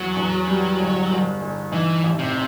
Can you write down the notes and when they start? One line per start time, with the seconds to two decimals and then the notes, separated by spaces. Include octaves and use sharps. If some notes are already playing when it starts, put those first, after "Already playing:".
Already playing: E2 F#3
0.16 E2
0.48 G3
0.80 G1
1.11 G1
1.42 G1
1.72 E3 D#4
2.04 A1
2.19 C3